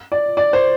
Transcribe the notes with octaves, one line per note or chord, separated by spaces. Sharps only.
D5
D5
C5